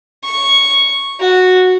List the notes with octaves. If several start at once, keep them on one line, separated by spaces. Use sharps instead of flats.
C#6
F#4